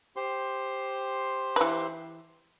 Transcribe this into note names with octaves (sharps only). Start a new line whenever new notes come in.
G4 C5 C6
E3 B4